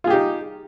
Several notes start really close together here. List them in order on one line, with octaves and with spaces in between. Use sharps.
F4 G#4 G4 D#4